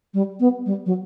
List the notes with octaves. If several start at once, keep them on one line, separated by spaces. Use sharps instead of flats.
G3
B3
G3
F#3